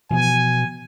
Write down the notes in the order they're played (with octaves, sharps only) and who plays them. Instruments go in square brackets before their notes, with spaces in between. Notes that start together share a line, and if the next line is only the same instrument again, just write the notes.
[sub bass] B2 [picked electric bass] E3 F3 B3 [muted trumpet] G#5